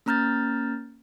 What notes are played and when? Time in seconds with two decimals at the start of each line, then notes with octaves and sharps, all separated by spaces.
0.06 A#3 C#4 A#5 F6 G6 A6